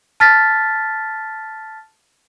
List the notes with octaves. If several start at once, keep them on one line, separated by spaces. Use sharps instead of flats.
A5 F6 A6 B6